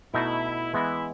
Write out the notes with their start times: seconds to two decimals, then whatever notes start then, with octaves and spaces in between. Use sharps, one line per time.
0.14 B2 A3 D#4 E4
0.73 E3 G#3 B3 E4